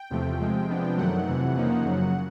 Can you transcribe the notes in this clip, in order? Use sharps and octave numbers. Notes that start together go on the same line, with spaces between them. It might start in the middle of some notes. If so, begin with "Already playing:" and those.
Already playing: G5
E2 C3 F3 A3
C3 F3 G#3
C3 F3 G#3 B3 D4
F#2 D#3 F#3 A3 F#5
F2 C3 E3
C#3 F3 A#3 D#4
F#2 C#3 F#3